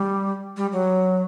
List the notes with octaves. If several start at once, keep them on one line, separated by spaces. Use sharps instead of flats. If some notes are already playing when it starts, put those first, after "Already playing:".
Already playing: G3
G3
F#3